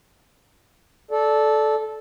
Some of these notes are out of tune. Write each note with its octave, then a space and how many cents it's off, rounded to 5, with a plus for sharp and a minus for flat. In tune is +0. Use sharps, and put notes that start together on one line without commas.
A4 -15 D5 +0